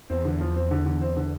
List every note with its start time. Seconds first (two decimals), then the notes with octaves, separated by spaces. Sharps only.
0.10 E2 C4
0.25 D3
0.40 F3
0.56 C4
0.71 D3
0.86 D3
1.01 C4
1.17 D3